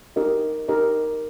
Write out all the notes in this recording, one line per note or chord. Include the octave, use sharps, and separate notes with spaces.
D#4 G4 A#4 D#5
D#4 G4 A#4 D#5